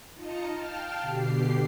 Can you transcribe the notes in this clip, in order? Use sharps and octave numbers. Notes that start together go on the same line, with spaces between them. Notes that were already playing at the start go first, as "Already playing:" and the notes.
D#4 F4 D#5 A5 A#5 C#7
F5 G5 A5 F6
B2 D3 G4 C7